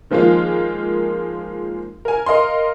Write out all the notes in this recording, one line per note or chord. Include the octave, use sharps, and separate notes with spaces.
D#3 F3 G#3 A#3 F4
A#4 G#5
A#4 D#5 F5 C6